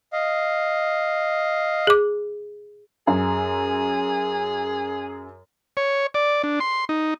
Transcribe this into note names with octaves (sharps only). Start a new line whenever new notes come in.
D#5 F5
G#4 D6
F#2 G#4
C#5
D5
D4
C6
D#4